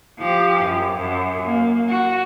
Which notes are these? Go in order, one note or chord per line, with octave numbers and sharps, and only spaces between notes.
F3 G4
F#2
F#2
A#3
F#4